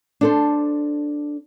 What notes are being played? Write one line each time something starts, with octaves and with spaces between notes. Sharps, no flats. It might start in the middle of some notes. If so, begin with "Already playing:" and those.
D4 A4 C5